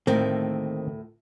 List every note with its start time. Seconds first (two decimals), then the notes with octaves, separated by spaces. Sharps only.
0.07 D2 A2 D#3 A#3 C4 A#4